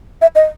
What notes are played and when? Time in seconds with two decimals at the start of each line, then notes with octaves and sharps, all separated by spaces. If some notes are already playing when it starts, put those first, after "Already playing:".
0.22 E5
0.35 D#5